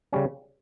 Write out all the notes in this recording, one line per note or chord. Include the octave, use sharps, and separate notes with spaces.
C#3 G3 C#4